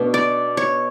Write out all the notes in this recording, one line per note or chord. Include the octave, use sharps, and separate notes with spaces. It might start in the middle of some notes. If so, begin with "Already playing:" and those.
Already playing: B2 A3 D4
D5
C#5